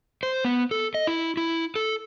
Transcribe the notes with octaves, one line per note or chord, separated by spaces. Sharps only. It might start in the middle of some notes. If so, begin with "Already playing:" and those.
C5
B3
A4
D#5
E4
E4
A4